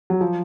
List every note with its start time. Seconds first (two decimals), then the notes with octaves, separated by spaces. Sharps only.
0.10 F#3
0.21 F3